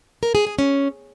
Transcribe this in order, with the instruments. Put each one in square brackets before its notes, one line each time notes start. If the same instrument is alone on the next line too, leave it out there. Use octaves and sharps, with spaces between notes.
[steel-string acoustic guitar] A#4
G#4
G#4
C#4